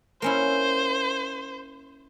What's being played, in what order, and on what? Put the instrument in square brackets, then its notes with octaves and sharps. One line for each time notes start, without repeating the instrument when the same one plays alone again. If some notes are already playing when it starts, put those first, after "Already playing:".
[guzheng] A#3 C#4 E4 [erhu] C5